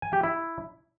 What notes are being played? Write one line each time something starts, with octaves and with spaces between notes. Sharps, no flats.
G#5
G4
E4